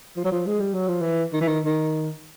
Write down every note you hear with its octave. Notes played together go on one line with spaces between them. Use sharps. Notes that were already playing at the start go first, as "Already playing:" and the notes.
F3
F#3
F3
G#3
G3
F#3
F3
E3
D#3
E3
D#3
D#3